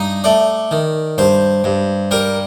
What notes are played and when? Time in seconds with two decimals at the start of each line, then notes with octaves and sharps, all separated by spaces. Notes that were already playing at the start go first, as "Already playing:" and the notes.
Already playing: G2 D#4
0.24 A3 D5
0.71 D#3
1.18 G2 C5
1.64 G2
2.11 G3 A#4